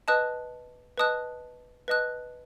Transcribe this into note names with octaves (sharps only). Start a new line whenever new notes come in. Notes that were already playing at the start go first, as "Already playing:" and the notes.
B4 D#5 A5 D#6 F#6
B4 D#5 A5 D#6 F#6
B4 D#5 A5 D#6 F#6